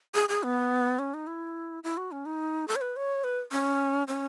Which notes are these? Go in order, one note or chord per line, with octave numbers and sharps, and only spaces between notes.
G#4
G#4
B3
C#4
D#4
E4
E4
F#4
C#4
D#4
A4
C#5
B4
C#5
B4
C#4
C#4